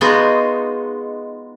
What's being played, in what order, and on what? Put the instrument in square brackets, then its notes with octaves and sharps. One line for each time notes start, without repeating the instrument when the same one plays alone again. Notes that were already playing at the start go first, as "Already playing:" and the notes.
[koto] G#3 B3 D#4 F4 F#4 G#4